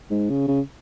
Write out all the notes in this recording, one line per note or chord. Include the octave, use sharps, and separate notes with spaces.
G#2
C#3
C#3